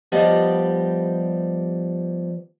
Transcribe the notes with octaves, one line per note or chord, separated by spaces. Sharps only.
F3 G3 B3 G4 D5 D#5